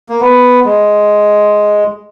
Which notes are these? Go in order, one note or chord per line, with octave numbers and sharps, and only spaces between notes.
A#3
B3
G#3